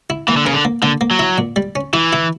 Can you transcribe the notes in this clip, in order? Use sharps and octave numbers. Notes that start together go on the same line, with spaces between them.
E4
E3 A#3
D3
C#3 A#4
D3
A#3
D3 A#3
A#3
F#3
E4
A#2
G3
C#4
E3 E4
E4